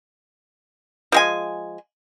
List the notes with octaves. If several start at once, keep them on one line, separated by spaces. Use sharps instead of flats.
F3 G#3 G#5